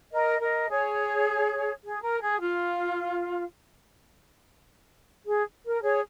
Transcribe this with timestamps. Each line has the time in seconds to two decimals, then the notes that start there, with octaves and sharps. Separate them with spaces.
0.12 A#4 D#5
0.40 A#4 D#5
0.69 G#4 C#5
1.84 G#4
2.02 A#4
2.21 G#4
2.40 F4
5.26 G#4
5.64 A#4
5.82 G#4 C#5